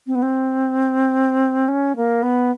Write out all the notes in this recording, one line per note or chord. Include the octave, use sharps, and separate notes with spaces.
C4
B3
C4
C#4
A#3
B3